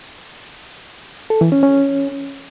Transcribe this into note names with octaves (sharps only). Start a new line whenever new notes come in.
A4
E3
C#4
C#4